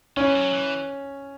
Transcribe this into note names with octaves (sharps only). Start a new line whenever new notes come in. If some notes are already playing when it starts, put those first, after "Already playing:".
E3 C#4
F#3
E3